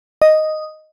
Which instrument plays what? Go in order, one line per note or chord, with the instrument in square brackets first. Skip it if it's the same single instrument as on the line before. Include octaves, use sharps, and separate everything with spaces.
[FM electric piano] D#5